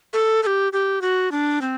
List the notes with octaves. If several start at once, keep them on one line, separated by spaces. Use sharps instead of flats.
A4
A4
G4
G4
F#4
D4
C4